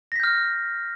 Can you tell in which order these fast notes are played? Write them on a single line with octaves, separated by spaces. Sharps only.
A#6 B6 G6 F6